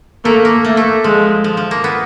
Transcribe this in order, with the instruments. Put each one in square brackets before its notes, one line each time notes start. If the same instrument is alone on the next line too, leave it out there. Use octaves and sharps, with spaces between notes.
[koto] A3 [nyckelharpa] A#3
[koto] A#3
[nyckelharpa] A3 [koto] A#3
[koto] A3
[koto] F3 [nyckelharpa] G#3
[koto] F3
F3
A#3
B3